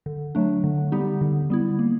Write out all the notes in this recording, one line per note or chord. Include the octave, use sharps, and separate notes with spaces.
D3
F#3 A3 D4
D3
G3 B3 D#4 G4
D3
G3 B3 E4
A#3